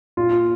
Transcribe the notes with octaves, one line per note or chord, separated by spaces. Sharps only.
A#2 F4